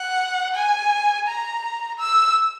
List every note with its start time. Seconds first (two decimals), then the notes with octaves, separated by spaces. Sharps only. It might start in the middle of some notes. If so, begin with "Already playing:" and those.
Already playing: F#5
0.55 G#5
1.28 A#5
1.99 E6